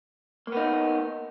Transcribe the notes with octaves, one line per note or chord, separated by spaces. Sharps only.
A#3 B3 D#4